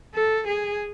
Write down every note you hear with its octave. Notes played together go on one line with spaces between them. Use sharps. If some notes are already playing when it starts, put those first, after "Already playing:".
A4
G#4